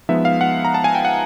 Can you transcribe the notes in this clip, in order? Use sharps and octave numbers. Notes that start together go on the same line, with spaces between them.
F3 G#3 B3 D#4 E5
F5
F#5
A#5
A5
G#5
G5
F#5